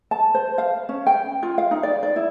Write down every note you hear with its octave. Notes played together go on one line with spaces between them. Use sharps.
A5
C5
F5
C#4
G5
F4
F5
D#4
D5
D5
E4